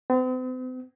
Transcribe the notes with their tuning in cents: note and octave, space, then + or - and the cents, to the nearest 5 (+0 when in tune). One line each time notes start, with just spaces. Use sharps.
C4 -45